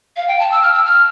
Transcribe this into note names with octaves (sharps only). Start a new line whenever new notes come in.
F5
G5
A5
E6
F6
E6
F6